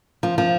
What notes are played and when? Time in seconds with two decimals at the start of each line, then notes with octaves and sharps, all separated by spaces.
0.23 F3
0.38 F3